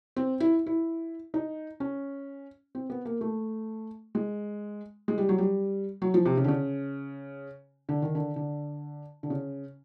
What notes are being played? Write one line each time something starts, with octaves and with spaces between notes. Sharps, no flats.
C4
E4
E4
D#4
C#4
C4
B3
A#3
A3
G#3
G#3
G3
F#3
G3
F#3
F3
C3
C#3
D3
C#3
D3
D#3
D3
D3
D3
C#3